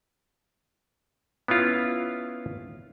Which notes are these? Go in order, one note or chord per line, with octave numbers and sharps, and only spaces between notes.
B3 C#4 E4 F4